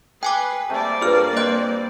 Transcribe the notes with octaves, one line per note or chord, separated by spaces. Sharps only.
G#4 B4 G5 G#5 D6
C3 G3 A3 A#3 D5 A5
G2 A#2 F4 G4 G#4 A#4 B4 F6
C4 D#5 G5 C6 F#6